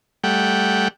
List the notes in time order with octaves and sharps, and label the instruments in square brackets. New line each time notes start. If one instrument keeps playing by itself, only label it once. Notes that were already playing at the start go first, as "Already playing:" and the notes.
[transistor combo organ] G3 A3 F#5 G5